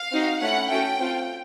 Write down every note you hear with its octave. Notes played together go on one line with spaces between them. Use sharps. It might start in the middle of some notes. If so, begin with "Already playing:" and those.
Already playing: F5
C4 D#4 F#4
A3 C#4 E4 F#5
A3 C#4 F#4 A4 G5
C4 F4 A4